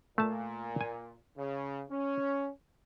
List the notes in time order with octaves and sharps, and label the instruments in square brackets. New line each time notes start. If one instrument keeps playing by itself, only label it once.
[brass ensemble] A#2 [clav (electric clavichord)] A3 A5
[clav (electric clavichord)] G#5
[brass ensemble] C#3
C#4